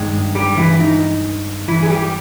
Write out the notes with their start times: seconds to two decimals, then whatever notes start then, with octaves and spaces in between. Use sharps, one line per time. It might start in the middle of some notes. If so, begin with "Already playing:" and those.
Already playing: G2 D#3 G#3
0.35 G3 G4
0.58 E3 E4
0.80 D#4
1.68 E3 E4
1.83 G#4
1.90 G3 G4